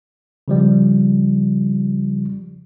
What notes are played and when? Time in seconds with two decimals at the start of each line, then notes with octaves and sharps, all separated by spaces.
0.48 C#3 F3 G3